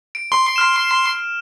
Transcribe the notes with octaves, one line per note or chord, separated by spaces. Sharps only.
D7
C6
F6 E7